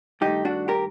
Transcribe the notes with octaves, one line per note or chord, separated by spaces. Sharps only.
G2 D#3 A3 D#4 G4
D4 F#4
G4 A#4